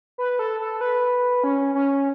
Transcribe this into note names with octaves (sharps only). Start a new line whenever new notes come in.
B4
A4
A4
B4
C#4
C#4